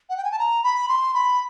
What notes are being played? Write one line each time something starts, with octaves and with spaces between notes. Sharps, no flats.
F#5
G5
G#5
A5
A#5
B5
C6
B5